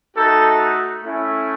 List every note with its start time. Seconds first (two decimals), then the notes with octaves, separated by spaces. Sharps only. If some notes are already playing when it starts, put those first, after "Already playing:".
0.16 A3 D#4 F#4 A4
1.04 A3 C#4 E4